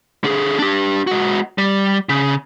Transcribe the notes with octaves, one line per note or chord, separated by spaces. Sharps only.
D3 G#4
D4 G4
G#3 F#4
G3
C#3